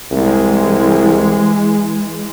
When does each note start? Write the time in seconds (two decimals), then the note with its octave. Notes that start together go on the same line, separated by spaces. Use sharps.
0.11 C2 E3 G#3